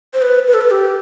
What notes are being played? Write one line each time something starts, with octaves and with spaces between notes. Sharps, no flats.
C5
B4
B4
A4
B4
G4